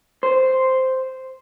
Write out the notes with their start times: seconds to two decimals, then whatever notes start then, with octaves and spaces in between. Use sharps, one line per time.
0.23 C5